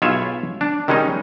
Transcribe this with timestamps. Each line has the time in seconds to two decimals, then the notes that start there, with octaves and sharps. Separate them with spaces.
0.02 B1 E4 F4 G#4 C#5 E5
0.61 D4
0.88 D#3 G3 G#3 C#4 D#4